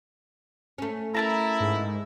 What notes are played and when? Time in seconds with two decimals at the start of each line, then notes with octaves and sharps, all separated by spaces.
0.78 A3 C#4
1.15 E4 A#4 A5 A#5
1.60 G#2